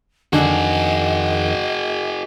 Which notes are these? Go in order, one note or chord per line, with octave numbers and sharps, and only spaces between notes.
F2 D3 D#3 F#4 G#4 D#5